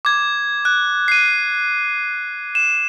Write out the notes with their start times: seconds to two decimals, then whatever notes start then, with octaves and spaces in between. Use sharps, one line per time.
0.05 D6 G#6
0.65 F#6
1.08 C7 D#7
2.55 E7